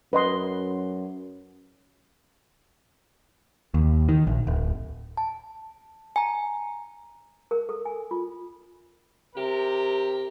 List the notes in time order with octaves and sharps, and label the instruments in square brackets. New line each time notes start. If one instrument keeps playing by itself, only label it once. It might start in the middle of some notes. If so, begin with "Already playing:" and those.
[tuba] F#2 [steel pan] B4 D#5 C6
[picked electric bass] D#2
D#3
A#1
D1
[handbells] A5
G#5 A#5
[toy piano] A#4
A4
G#5
F4
[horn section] C3 G4 A#4